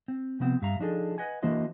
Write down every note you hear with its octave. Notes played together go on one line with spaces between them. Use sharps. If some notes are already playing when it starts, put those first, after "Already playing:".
C4
C3 F3 B3 C4
G2 E5 F5 A#5
F3 D4 D#4 G#4 A4
B4 D#5 F#5 G#5
E3 A#3 D4 F#4 C5 D#5